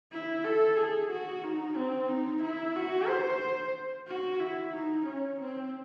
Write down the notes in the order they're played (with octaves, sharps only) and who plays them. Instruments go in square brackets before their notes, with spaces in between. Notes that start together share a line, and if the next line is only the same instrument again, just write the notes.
[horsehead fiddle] E4
A4
G#4
F#4
D#4
C4
D#4
E4
F#4
C5
F#4
E4
D#4
C#4
C4